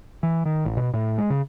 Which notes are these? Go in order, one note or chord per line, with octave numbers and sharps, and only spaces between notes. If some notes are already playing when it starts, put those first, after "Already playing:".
E3
D#3
A1
B2
A2
G#3
C#3